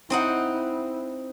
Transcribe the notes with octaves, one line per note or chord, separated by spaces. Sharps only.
C4 D#4 E4 F#5